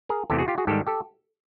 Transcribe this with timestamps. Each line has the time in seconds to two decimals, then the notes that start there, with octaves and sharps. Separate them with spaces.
0.09 G#4 A#4
0.30 E2 C3 E3 A3 G4 A4
0.38 F#4 G#4
0.48 F4 G4
0.58 F#4 G#4
0.67 G#2 D#3 G3 G4 A4
0.87 G4 A4